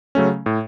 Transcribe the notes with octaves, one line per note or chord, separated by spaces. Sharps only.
C#3 F#3 A3 C#4
A2